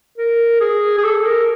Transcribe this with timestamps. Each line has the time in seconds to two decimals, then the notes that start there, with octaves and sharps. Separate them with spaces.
0.18 A#4
0.60 G#4
0.98 G#4
1.04 A4
1.26 A#4